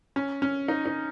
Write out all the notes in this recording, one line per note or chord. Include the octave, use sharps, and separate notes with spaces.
C#4
C#4
D#4
D#4